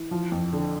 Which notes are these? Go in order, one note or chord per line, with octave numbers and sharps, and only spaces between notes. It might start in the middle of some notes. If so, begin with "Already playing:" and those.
Already playing: E3
F3
F2
D3